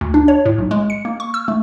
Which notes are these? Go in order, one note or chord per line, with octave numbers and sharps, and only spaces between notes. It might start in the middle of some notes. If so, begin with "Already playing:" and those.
D2
D4
C#5
A2
B1
G#3
C#7
A#3
C#6
E6
A3